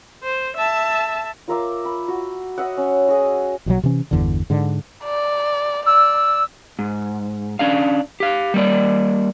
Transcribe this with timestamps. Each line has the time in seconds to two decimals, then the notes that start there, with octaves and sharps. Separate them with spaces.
0.23 C5
0.56 E5 A5
1.48 F4 A#4 E5 D6
1.85 B5
2.08 F#4
2.58 D#5 E5 F#5
2.77 C#4
3.08 F#4 G#4 D#5
3.66 A#1 B2 D3 F#3
3.83 C3 E3 C#4
4.11 G1 E2 D3
4.50 G#2 D3
5.04 D5
5.86 D5 E6
6.79 G#2
7.59 C#4 D4 F5
8.20 G4 F5
8.54 G3 A#3 D5